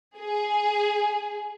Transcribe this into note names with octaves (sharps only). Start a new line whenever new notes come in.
G#4